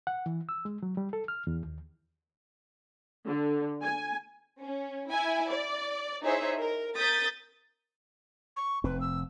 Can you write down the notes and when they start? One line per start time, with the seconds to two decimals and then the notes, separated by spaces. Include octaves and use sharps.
0.07 F#5
0.26 E3
0.49 E6
0.65 G#3
0.83 F#3
0.97 G3
1.13 A4
1.28 F6
1.47 E2
1.63 D#2
3.26 D3
3.83 G#5
4.61 C#4
5.10 E4 G#5
5.50 D5
6.24 D#4 E4 G#4 C5 C#5 E5
6.58 A#4
6.97 A#4 D#6 G6 A6 B6
8.56 C#6
8.84 F1 C4 B4
9.00 E6